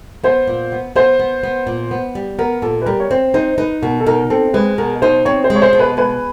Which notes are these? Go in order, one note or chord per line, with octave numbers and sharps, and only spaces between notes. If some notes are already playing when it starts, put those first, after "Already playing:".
B3 C5
A#2
B3
B3 C5
B3
B3
A#2
B3
G3
B3 A#4
A#2 A4
B4
G3 A#4
C#5
C4 C5
D#4 C5
D#4 B4
B2 A#4
A4
D#4 A#4
C4 A4
G#3 B4
B2 A#4
D#4 C5
C4 C#5
C5
G#3
C#5
C5
B2
B4
G#3 B4